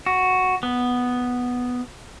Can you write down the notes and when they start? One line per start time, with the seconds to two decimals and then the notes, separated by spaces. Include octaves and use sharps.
0.06 F#4
0.63 B3